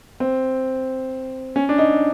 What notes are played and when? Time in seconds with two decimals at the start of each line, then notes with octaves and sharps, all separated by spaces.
0.20 C4
1.56 C#4
1.69 D4
1.78 D#4